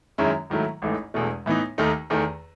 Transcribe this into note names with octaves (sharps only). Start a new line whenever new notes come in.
F#2 D#3 G#3 C#4 E4
G#2 D#3 F#3 A3 E4
A1 G#2 E3 A3 D#4
E1 E2 B2 A3
A2 E3 B3 D#4
D#2 D#3 A3 D#4
E2 D#3 A3